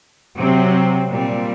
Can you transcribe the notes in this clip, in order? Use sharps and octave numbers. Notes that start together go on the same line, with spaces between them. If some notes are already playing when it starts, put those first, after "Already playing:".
C3 F#3 C4
A#2 G3 C4